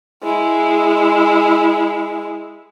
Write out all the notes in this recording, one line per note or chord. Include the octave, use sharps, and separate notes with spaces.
G#3 E4